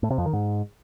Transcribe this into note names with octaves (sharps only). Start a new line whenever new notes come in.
A2
C3
F2
D#3
G#2